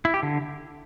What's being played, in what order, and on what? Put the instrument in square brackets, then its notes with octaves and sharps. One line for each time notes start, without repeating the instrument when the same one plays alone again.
[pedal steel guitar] E4
G4
D3